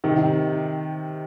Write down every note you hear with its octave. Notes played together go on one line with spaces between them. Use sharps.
C3 D#3